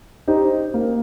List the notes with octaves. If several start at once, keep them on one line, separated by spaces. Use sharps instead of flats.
D#4 G4 C5
A#3